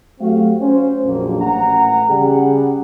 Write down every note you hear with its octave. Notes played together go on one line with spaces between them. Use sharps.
F#3 A3 C4 F#4 G4 F5
C#4 C5
A#1 F2 F#3 A#3
A1 F#5 A#5
C#3 G3 G#4 F#5